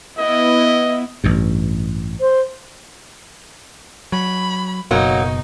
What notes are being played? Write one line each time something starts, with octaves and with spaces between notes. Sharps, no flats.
B3 E4 D#5
A1 G2
C5
F#3 B5
F#1 B2 F#3 A#3 D#4